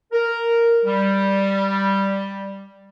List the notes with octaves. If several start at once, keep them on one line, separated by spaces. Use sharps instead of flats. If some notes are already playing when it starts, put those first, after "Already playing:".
A#4
G3